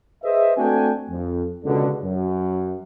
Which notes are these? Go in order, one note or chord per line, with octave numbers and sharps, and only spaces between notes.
G#4 B4 C5 D#5 E5
A3 C4 D4 F#4 G5 G#5
F2
C#2 B2 D3
F#2